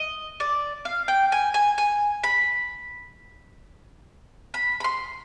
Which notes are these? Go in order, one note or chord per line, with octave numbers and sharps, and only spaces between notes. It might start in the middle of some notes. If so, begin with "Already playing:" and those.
Already playing: D#5
D5
F5
G5
G#5
G#5
G#5
B5
B5
B5
C6